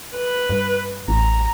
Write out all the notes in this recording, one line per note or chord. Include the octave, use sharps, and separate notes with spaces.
B4
G2
A1 A#5